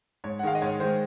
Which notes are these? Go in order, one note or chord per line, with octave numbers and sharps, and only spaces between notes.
G#2 C#5
F#5
D#3 G#3 F5
D#5
G#2 C#5
D#3 G#3 C5